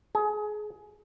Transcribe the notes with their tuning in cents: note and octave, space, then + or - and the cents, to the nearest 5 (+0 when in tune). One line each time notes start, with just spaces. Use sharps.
G#4 +25